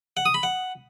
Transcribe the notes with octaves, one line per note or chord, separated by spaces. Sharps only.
F#5
D#6
B5
F#5